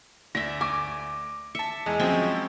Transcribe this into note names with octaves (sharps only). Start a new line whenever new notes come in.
D2 D5 E5 A#6
G#5 D6
E5 A5 C#7
E2 G#3
F3 F#3 C4 C#4 E5